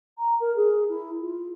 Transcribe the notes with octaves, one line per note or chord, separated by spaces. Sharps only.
A#5
A#4
G#4
E4
F4